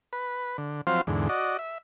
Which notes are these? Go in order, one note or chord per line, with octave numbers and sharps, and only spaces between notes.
B4
D3
F3 F#3 C4 F4 C5 F5
E2 G#2 D3
F#4 D5 D#5
E5